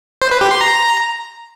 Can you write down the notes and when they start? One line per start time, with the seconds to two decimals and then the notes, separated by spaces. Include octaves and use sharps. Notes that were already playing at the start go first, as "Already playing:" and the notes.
0.22 C5
0.31 B4
0.41 G4
0.51 C6
0.61 A#5